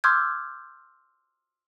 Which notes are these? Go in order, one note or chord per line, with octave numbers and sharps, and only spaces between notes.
C6 D6 E6 F6 G6 G#6